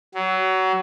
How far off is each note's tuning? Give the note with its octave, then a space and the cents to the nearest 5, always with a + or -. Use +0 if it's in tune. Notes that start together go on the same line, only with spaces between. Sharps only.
F#3 +25